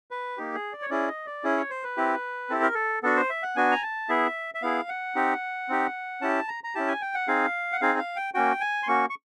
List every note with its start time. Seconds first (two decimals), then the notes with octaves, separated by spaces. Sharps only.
0.11 B4
0.37 A#3 D#4 G4
0.55 G#4
0.73 D5
0.82 C#5
0.90 C#4 E4 G#4 D5
1.08 D#5
1.26 D5
1.44 C#4 E4 G#4
1.57 C#5
1.70 C5
1.83 B4
1.97 C4 E4 G4
2.50 C4 E4 G4 A4
2.62 A#4
2.75 A4
3.03 B3 D4 F#4 A4
3.16 C5
3.30 E5
3.43 F#5
3.56 B3 D4 F#4 G#5
3.72 A#5
3.82 A5
4.09 B3 E4 G#4 E5
4.55 E5
4.62 B3 E4 G#4 F5
4.89 F#5
5.15 C4 D#4 G4
5.69 C4 D#4 G4
6.21 C#4 E4 G4 A5
6.48 A#5
6.64 A#5
6.75 C#4 E4 G4 A5
6.88 G#5
7.02 G5
7.15 F#5
7.28 C4 D#4 G#4 F5
7.72 F#5
7.81 C4 D#4 G#4 F5
7.99 F5
8.16 G5
8.34 A#3 C#4 F#4 G5
8.60 G#5
8.83 C6
8.87 A#3 C#4 F#4 C#6
9.10 C#6